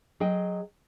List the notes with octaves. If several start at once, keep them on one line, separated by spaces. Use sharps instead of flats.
F#3 G#4 D#5 G5